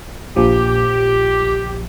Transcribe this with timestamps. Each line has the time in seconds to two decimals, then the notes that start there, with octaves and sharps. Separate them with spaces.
0.36 A#1 F3 G4